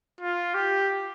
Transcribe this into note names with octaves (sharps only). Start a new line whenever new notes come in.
F4
G4